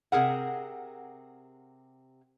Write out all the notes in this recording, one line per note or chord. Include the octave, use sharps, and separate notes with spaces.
C3 G#4 A#4 F#5